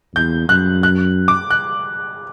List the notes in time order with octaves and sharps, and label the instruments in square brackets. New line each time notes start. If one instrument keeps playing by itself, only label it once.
[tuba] E2 [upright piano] G6
[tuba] F#2 [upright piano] F#6
[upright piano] F#6
D6
F#6